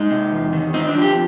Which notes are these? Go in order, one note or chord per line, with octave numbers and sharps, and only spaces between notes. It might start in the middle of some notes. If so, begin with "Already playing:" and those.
Already playing: G#3 D#4
C3
E2
D#3
C4 D#4
D4
F3
G4